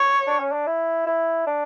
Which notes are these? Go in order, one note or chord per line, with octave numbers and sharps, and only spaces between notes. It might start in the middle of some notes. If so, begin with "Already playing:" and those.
Already playing: C#5
D4
C#4
D4
E4
E4
D4